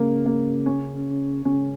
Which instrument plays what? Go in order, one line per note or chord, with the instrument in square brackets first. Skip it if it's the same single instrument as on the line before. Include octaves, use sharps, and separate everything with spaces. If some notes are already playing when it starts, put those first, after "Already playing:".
Already playing: [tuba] C#3 [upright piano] A#3
[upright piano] A#3
C#4
[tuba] C#3 [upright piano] C#4